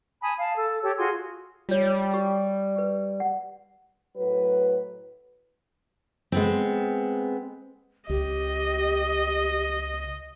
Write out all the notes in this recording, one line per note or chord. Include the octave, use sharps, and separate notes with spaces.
G#5 A5 B5 D#6
F5 A5
A4
G4 A4 C#5
F4 F#4 G#4 C6
G3 F4 C#5
G4
G4 B4
F#5
A2 F#3 B4
G#3 B3 C4
C#2 G4 D#5